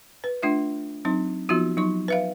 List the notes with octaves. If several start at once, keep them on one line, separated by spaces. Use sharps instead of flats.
B4
A3 D4 F4 E5
F#3 C4 D#4
F3 B3 D#4 F4 F#4
F#3 D#4 C#6
B4 E5 F5